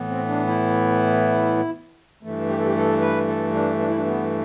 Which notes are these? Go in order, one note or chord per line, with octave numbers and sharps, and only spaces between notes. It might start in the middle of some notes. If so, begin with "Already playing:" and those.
Already playing: A2 E3 B3
C4
D4
E4
G2 E3 A3
G4
A4
G4
A4
B4
A4
D4
D4
E4
D4
B3